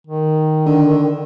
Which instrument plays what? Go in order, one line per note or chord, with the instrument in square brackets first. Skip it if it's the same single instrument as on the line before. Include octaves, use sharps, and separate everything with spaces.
[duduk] D#3
[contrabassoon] D3